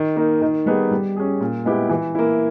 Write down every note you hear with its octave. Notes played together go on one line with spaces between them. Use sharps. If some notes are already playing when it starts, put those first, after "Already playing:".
Already playing: D#3
A#3 D#4
D#3
G3 B3 D#4 G#4
G3
C#4 G#4
A#2
G#3 B3 E4 G4
E3
A#3 E4